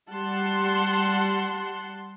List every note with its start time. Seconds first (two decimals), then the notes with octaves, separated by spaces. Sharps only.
0.10 G3 F#5 A5 C6